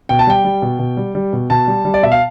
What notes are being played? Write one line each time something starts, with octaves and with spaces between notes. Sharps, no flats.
B2 G5
A5
G3 G5
G3
B2
B2
G3
G3
B2
B2 A5
G3
G3
D5
B2 E5
F5